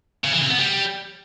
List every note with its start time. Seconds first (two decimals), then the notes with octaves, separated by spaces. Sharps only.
0.24 C#3
0.33 E3
0.42 C3
0.50 B3
0.59 G3